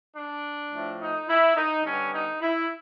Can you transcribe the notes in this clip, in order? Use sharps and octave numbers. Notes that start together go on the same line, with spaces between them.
D4
A2 F3 A3
D#4
E4
D#4
D3 G3 B3 C#4
D#4
E4